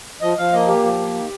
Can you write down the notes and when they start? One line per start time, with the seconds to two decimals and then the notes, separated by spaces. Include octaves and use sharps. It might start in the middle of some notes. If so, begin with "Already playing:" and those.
0.22 F3 D#5
0.38 F3 F5
0.53 A#3 D#5
0.68 A#2 G4
0.83 F3
0.99 A#3
1.14 D#3